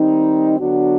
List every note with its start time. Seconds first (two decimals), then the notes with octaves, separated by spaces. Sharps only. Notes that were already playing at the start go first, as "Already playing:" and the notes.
Already playing: D#3 G3 C4 D#4
0.59 D3 F#3 B3 D4 F#4